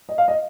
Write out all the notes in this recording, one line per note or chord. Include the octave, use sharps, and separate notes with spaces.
D#5
F5
D#5